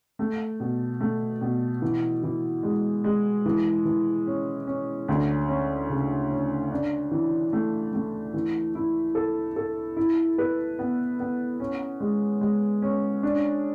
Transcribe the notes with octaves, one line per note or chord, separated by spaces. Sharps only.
A3
B2
A3
B2
E3
E3
G#3
G#3
E3
E3
C#4
C#4
D2
C#4
C#3
C#4
D4
E3
A3
A3
E3
E4
A4
A4
E4
B4
B3
B3
C#4
G#3
G#3
C#4
D4